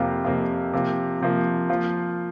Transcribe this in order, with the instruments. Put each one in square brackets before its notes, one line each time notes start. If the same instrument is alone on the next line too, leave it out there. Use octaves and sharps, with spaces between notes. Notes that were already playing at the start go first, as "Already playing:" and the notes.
Already playing: [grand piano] F2 C3 A#3 F4
F2 C3 A#3 F4
C3 F3 A#3
C3 F3 A#3
F3 A#3 F4